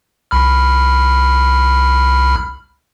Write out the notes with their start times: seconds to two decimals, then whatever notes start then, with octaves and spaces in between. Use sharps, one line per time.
0.31 C2 B5 F6